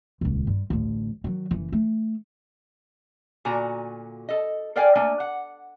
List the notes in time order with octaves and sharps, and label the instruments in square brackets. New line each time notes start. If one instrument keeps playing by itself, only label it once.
[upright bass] D#1 C#2
G2
A1 D2
D#3 F#3
F#1 E3
A3
[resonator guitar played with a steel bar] A#2 D3 F#4 G#5 A#5
A4 D#5
A4 A#4 D5 F5 G5 G#5
A3 A#3 D4 G#5
F#5